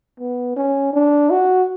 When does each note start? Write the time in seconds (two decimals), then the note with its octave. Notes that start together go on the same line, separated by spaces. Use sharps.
0.20 B3
0.56 C#4
0.93 D4
1.31 F#4